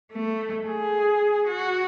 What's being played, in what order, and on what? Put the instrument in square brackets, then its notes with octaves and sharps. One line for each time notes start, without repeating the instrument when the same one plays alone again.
[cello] A3
G#4
F#4